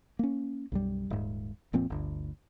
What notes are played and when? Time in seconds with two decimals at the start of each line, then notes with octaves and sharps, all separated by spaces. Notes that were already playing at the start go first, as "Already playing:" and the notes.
0.19 A#3 C#4
0.72 B1 F#2 G3
1.10 D#1 G#2
1.73 F1 A#2 F3 C4
1.90 G1 D2